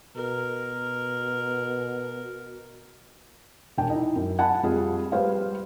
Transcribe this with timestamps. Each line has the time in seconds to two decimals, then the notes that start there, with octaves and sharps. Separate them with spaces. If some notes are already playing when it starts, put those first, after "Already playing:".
0.16 B2 A#4
3.78 E1 D4 G5 G#5
3.90 D#4 E4
4.16 F#2
4.38 D#5 F#5 G#5 A5 B5
4.63 F2 G3 F4 G#4
5.12 G3 B4 C5 F5